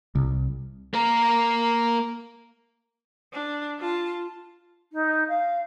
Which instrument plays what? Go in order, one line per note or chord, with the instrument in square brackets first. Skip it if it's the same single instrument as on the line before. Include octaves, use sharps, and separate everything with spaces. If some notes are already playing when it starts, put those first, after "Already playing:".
[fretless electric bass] C2
[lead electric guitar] A#3 A#4
[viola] D4
F4 A5
[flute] D#4
F5